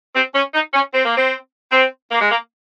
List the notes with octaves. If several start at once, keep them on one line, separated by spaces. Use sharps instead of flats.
C4
C#4
D#4
C#4
C4
A#3
C4
C4
A#3
G#3
A#3